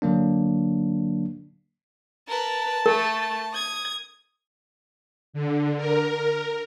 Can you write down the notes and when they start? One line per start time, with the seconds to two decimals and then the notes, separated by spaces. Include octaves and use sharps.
0.02 D3 F#3 A#3 D4
2.28 A#4 B4 A5
2.86 A3 A#4
3.54 D#6 G#6
5.33 D3
5.77 A#4